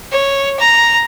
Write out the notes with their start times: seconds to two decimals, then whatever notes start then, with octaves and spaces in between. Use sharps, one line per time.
0.12 C#5
0.60 A#5